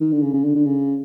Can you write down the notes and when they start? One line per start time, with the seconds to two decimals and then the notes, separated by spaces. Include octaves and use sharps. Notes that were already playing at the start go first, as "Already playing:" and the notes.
0.01 D#3
0.12 D3
0.22 C#3
0.34 C#3
0.44 D3
0.55 D3
0.66 C#3